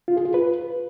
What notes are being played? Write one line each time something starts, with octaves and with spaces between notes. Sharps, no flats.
F4
G#4
F4
B4